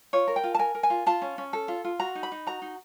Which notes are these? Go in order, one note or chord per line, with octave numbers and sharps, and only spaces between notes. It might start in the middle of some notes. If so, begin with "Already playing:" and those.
F4 C#5
A#4
G5
F4
A5
A#4 G#5
A#4
G#5
F4
F4 A5
C#4
C#4
A4
F4
F4
F#4 A#5
D#4
B5
D#4
F#4 A#5
D#4